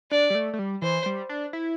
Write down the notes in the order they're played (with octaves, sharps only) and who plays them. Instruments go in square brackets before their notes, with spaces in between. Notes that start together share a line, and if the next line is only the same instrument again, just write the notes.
[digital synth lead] D4 [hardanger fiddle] D5
[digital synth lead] G3
A3
A3
G3
[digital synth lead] E3 [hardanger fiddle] C5
[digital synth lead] G3
D4
E4